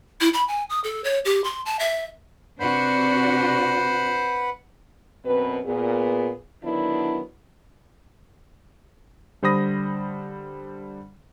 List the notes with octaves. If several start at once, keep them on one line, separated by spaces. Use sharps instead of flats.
E4
B5
G#5
D#6
A4
C#5
G4
C6
A5
E5
C3 D4 F#4 B4 C5 F#5 B5
F#2 B2 C4 B4
A#2 B3 G#4
D3 D#3 F#3 B3 D4 E4
D3 G3 C5 B5 D#6 A#6